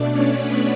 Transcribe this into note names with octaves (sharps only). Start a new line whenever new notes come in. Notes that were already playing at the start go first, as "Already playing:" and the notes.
Already playing: B2 A3 D4 D5
C#4 C#5
B3 B4